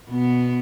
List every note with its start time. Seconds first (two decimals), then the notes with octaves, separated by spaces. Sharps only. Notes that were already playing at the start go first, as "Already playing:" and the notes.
0.10 B2 B3